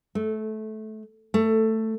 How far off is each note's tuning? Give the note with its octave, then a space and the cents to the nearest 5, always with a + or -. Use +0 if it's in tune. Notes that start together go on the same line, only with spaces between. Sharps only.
A3 -20
A3 +10